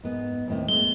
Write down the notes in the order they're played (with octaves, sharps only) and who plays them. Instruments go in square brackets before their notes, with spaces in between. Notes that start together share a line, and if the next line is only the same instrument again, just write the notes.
[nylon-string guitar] G#2 B3
D#2 A2 C4
[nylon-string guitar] G#3 B3 [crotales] G7